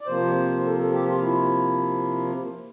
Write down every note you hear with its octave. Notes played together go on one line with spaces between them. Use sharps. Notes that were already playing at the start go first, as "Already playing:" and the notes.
D5
C3 F3 A#3 C5
A4
A4
G4
F4
E4